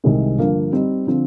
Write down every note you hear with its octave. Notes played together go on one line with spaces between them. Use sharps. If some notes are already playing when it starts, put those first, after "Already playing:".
C2 C3 D#3 G#3 C4
G2 D3 F3 A#3
G3 C4 D#4
D3 F3 C4